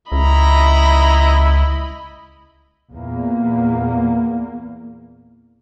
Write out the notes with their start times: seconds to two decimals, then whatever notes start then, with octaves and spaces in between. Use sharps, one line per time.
0.12 C#2 E4 D#5 A#5 B5
2.92 E2 A#2 A#3